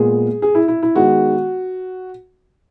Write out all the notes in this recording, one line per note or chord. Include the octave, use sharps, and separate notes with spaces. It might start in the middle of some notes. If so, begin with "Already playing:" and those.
Already playing: A#2 G#3 B3 G#4
G#4
E4
E4
E4
D#3 G#3 B3 F#4